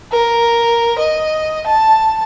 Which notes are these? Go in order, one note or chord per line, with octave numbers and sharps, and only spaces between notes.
A#4
D#5
A5